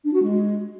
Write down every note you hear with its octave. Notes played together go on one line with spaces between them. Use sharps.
D4
F#4
G#3